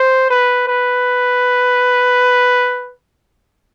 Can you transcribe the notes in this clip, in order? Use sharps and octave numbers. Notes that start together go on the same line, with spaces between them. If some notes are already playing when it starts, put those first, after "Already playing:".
Already playing: C5
B4
B4